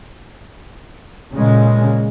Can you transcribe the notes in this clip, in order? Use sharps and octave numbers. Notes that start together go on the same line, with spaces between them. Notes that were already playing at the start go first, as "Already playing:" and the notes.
A#2 C#3 G#3